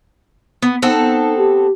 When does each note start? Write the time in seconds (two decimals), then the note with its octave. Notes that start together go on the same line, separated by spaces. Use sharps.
0.62 B3
0.82 B3 C4 D#4 A4
1.38 G4